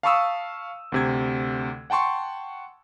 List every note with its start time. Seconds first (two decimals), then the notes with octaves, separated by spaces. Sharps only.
0.03 F5 A5 B5 C#6 D#6 E6
0.92 D2 C3 G#6
1.90 F#5 G5 A5 C6 C#6